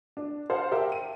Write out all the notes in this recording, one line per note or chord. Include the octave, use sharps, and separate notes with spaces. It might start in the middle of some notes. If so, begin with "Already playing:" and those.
D4
C5 F5 F#5 A5
G4 A#4 E5 G5
D#7